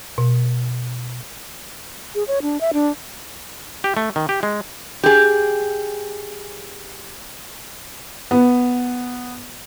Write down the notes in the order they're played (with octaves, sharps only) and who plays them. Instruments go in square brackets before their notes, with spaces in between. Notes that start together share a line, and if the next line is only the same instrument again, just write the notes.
[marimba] B2
[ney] G#4
C#5
D4
E5
D4
[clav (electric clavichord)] G4
A3
D#3
G4
G#3
[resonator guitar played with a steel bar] G4 G#4
[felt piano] B3